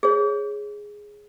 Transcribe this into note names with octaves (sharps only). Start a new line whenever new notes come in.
G#4 C#5